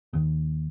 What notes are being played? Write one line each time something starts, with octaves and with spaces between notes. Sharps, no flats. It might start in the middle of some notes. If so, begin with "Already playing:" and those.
D#2